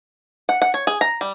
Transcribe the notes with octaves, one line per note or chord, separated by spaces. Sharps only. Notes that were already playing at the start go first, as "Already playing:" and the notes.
F#5
F#5
C#5
G#4
A#5
G3